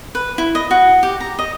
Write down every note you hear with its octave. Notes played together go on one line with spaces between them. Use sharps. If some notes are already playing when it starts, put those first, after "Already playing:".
B4
E4
D#5
F#4
G4
A#5
D#5